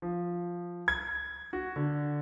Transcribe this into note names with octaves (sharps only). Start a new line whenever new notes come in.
F3
G#6
F#4
D3